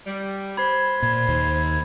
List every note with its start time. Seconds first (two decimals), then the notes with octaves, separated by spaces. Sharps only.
0.06 G3
0.57 B4 C5 B5 G#6
1.02 A#2 G#6
1.28 D#2 D#3